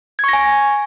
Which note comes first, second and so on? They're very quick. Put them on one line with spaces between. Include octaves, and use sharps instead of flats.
G#6 C#6 A#6 G#5